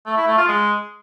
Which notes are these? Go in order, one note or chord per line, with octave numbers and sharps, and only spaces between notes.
A3
E4
A3
F4
G#3